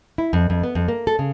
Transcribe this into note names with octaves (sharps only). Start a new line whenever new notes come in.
E4
F2
F2
B3
F2
A#3
A4
C#3